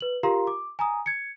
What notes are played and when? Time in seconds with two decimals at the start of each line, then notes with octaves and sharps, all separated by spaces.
0.01 B4 F#7
0.23 F4 G4 A#4 F5 A#5 C6
0.47 D6
0.79 G#5 A#5 D#6
1.06 G#6 C#7